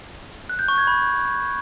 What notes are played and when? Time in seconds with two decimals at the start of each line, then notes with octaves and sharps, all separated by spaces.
0.50 F#6
0.59 G6
0.68 C#6
0.78 G#6
0.87 B5